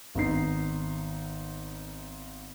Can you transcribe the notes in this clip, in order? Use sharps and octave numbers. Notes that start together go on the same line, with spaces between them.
G#1 B3 D#4 C7